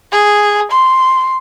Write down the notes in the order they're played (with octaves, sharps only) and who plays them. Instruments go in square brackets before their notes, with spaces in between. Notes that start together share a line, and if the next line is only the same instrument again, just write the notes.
[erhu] G#4
C6